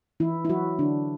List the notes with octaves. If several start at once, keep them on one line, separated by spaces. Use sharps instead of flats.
E3 E4
E4
F#3 F#4
D3 D4